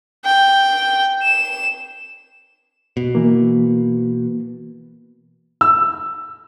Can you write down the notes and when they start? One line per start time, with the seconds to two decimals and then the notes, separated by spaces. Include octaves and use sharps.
0.25 G5
1.22 E7
2.97 B2
3.15 E3 A#3
5.61 E6